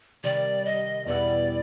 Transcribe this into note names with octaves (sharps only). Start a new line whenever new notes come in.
C3 D#3 G3 D5
D#5
E2 B2 G3 B3 E4 D5